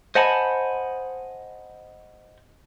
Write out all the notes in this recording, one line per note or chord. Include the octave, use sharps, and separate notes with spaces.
C5 D#5 F#5 G#5 A5 B5